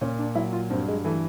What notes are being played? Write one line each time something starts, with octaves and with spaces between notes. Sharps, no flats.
A#2 C#4
D4
F#3 E4
F4
G2 C4
G#3
E3 A3